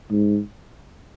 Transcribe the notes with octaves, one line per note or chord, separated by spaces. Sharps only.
G#2